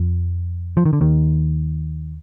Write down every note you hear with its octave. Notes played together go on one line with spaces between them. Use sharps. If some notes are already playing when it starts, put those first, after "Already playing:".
Already playing: F2 F3
F3
D#3
D3
D#2 D#3